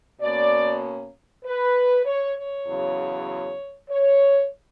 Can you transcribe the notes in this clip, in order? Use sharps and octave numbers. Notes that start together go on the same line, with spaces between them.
B2 A#3 C#4 D5
B4
C#5
C#5
E2 C#3 F#3
C#5